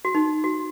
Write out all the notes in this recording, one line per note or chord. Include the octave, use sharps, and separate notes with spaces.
F#4
D#4
F#4